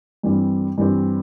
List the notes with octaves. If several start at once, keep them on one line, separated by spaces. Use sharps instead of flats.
G2 E3 G3 C4
G2 E3 G3 C4